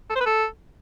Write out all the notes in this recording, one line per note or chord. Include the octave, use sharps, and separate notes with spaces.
A4
C5
B4
A4